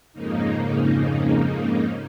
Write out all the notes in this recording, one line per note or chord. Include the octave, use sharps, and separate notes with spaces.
F2 G#2 C#3 A#3 D#4